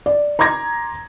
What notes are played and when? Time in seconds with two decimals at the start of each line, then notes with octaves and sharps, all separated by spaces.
0.06 D5
0.39 A#5 C6 D6 G#6 A#6